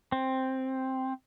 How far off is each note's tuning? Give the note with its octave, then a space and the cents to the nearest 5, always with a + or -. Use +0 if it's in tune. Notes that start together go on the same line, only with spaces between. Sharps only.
C4 +5